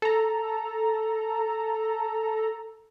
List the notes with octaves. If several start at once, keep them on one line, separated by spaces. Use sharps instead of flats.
A4 A#5